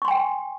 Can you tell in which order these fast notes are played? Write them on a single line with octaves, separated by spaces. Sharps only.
C#6 C6 G#5 G5